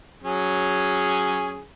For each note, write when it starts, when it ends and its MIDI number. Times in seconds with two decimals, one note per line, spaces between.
0.23 1.62 54
0.23 1.62 61
0.23 1.62 68